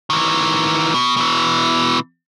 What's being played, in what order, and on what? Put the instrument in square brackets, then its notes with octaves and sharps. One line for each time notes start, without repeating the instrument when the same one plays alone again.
[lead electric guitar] D#3 E3
B2
B2 E3